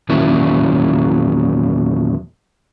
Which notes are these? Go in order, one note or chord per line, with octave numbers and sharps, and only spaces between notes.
E2 A#2 D#3 F#3 C#4 E4